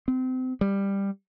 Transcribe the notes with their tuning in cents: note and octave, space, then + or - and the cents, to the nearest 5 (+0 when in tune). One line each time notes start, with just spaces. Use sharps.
C4 -30
G3 +10